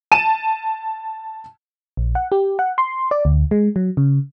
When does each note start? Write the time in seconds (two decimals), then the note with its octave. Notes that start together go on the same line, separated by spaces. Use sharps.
0.12 A5 D#7 E7
1.97 A#1
2.15 F#5
2.32 G4
2.59 F#5
2.78 C6
3.11 D5
3.25 D2
3.51 G#3
3.76 F#3
3.97 C#3